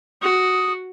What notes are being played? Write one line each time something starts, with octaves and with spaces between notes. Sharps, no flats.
F#4 D#6